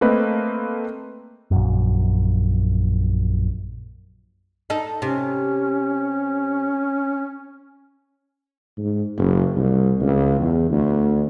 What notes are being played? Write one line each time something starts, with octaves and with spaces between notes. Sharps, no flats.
A3 A#3 C4 B4 D#5
A#1 F#2
D#4 A4
C3 C#4
G#2
F#1
C2
C#2
E2
D2